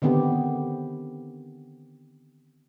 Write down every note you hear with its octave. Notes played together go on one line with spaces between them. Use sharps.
D3 D#3 B3 C4 G4